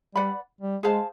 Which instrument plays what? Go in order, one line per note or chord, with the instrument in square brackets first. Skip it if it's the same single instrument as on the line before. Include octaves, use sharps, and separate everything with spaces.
[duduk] G3 [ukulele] B4 D5 F#5 B5
[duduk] G3
[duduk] G#3 [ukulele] G#4 C5 F5 A5